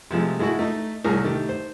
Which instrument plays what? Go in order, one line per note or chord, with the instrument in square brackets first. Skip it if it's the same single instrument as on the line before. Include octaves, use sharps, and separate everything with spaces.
[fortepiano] C3 F3 G#3 A3
G#3 A3 E4 F#4
A3 D#4
C2 A2 G#4 A#4
D#3 A3 G4
C5